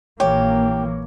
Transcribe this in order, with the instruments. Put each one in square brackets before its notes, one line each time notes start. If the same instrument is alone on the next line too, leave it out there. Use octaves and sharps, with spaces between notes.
[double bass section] A#1 E3 A#3 [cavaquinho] G4 [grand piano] C#5